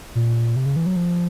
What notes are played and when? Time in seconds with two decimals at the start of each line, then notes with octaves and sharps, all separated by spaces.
0.15 A#2
0.56 C3
0.66 C#3
0.76 E3
0.86 F#3
0.96 F3